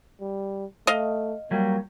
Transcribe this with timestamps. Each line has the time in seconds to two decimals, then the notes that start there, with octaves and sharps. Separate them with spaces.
0.21 G3
0.87 A3 D#5 F5
1.51 F#3 G3 A#3